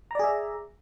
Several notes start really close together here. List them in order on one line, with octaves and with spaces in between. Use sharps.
A#5 D5 G#4 E5